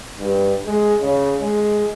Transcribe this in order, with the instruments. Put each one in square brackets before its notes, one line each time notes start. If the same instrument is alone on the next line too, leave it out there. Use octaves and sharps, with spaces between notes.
[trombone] G2
G#3
C#3
G#3